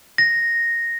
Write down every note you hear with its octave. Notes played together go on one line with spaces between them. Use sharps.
A#6